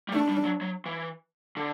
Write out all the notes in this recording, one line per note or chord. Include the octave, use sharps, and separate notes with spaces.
G3
A3 D4
G3
F#3
F#3
E3
D3